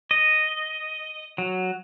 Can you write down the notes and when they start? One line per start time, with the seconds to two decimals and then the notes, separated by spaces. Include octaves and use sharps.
0.11 D#5
1.38 F#3